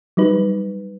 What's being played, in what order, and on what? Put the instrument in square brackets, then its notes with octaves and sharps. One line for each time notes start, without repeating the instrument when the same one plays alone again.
[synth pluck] F#3 G3 D#4 B4